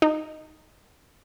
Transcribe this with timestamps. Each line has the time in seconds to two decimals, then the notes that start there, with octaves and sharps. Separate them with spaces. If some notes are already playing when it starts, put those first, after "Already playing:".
0.02 D#4